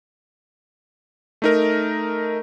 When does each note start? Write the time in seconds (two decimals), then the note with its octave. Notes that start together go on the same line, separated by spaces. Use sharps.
1.42 A3 D#4 A#4